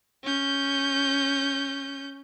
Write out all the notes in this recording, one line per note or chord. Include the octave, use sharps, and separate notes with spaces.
C#4 G6